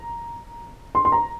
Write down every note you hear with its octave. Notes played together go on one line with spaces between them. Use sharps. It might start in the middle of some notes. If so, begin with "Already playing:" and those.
Already playing: A#5
C6
C6
A#5